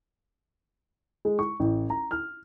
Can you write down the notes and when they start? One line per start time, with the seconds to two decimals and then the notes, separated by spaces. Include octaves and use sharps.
1.25 G#3
1.39 C#6
1.60 A1
1.90 A#5
2.11 F6